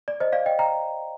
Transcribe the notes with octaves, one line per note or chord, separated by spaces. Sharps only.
D5
C5 D#5
D5 F5
D#5 G5
G5 A#5